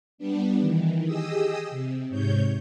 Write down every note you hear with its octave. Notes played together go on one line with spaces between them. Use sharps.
G3 B3 D4
D#3 E3
G4 G#4 D#5 D#6 E6
C3
G#2 C3 C#5 G6